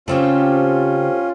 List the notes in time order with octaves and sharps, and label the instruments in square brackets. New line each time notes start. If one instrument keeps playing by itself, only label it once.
[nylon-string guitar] C#3 [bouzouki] A3 C4 G4 [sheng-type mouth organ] C#4 F4